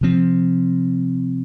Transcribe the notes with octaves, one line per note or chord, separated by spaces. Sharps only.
C3 F3 C4